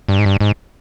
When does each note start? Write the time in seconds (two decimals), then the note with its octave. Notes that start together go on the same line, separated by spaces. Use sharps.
0.09 G2
0.19 G#2
0.25 G2
0.40 G#2